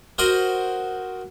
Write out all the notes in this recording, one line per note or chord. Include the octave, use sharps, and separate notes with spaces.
F#4 A#4 C5 D#5 F#5